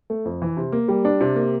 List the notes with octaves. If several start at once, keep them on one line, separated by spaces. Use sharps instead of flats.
A3
F2
E3
C3
A#3
G3
D4
C3
A#3